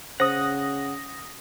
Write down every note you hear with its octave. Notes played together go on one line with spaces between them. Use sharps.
C#3 C5 F#5 D#6 A#6